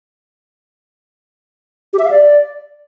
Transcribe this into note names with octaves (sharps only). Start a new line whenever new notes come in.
G4
E5
F5
D5